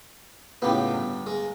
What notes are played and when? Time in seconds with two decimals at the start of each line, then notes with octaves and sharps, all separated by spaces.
0.62 C#2 A2 B3 G4
0.93 G1
1.27 G#3